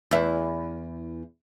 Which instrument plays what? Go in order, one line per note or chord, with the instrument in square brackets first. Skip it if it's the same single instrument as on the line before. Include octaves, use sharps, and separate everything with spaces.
[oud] E2 E4